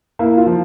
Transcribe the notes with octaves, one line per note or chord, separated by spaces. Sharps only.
A#3 E4
F4
F3